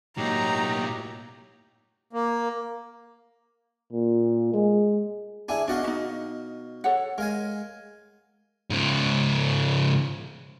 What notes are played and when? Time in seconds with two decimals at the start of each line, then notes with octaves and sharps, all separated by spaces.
0.18 A2 F#3 A#3 D#4 G4 A#5
2.13 A#3
3.92 A#2
4.54 G#3
5.49 D4 E4 G#4 G#5
5.68 B2 D4 F#4 D#5 F5
5.84 C#4 D#4
6.84 A4 C#5 F#5
7.18 G#3 A#4 F5 G#5
8.70 G#2 C#3